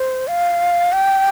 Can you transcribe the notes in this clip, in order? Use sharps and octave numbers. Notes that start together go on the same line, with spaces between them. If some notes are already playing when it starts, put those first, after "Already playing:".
Already playing: C5
F5
G5